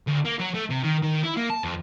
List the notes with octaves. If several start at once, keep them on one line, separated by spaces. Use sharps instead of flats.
D2
A#3
F#3
A3
C3
D#3
D#3
E4
A#3
A5
F2